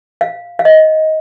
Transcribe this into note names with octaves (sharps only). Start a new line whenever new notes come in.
F5
F5
D#5